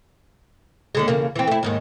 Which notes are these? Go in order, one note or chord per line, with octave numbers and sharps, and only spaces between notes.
D#2 D3 G#3
E2 C#3 A#3
E3 C4
A3 E4
D#2 G#2 D#3